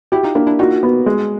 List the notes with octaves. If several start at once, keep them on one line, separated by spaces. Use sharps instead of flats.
E4 F#4 G4
D#4 F4
A#3 D4 E4
D4 E4
D#4 F4 F#4
B3
G#3